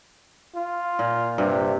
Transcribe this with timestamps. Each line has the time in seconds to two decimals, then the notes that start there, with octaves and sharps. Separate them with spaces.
0.56 F4
0.99 A#2
1.38 G2 C3